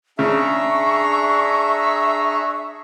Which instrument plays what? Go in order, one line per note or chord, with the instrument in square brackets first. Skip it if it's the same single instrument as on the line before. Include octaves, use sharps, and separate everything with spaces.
[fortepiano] C#3 [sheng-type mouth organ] D4 G#4 A#5 [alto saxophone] E5 [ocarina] C#6